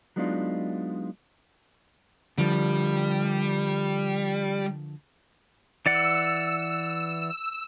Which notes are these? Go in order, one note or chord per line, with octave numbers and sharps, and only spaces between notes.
F#3 G#3 B3 D4 D#4 F4
D3 F3 G3
E3 D5 F#5 E6